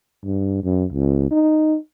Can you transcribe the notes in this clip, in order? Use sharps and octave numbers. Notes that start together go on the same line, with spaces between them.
G2
F#2
C#2
D#4